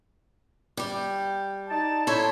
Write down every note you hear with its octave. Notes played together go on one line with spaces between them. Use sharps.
G3 G4
D#4 D5 A5
D#4 E4 A4 C5 C#5